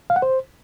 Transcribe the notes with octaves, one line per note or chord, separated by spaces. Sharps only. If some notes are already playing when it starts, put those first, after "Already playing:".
F5
F#5
C5